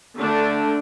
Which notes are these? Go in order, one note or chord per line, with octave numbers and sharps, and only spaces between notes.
D3 A3 D4